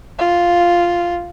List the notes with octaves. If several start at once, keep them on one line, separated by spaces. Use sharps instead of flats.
F4